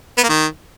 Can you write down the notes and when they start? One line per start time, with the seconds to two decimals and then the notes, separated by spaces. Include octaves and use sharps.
0.18 B3
0.23 A#3
0.29 D#3